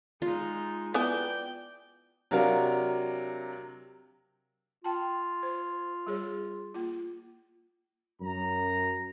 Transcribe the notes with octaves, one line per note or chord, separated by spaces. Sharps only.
G#3 D#4 F4
B3 E4 D5 G5 G#5
C3 F#3 D4 A#4 F5
F4 G5 A5
C5
G3 G#4 C#5
A#3 F4
F#2 A#5